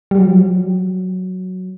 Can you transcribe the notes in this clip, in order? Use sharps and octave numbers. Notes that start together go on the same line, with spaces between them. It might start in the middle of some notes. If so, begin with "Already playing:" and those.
G3
F#3
F3
F#3